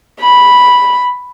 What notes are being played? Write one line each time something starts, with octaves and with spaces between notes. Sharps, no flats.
B5